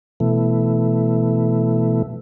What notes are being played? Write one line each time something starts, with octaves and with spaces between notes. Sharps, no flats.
B2 E3 A3